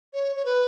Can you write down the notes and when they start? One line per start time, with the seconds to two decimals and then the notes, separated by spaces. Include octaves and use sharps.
0.14 C#5
0.36 C#5
0.45 B4